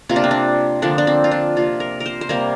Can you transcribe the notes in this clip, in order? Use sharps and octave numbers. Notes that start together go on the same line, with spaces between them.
C3 A#3 F4
D4
C4
D4
D3 F3 A#3 D4
D4
C4
F4
D4
C3 A#3 F4
A#4
A#4
C5
C5
C3 G3 A#3 A#4